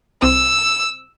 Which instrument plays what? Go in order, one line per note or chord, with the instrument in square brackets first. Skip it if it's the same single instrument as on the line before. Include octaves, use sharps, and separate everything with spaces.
[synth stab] C2 C3 C4 [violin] E6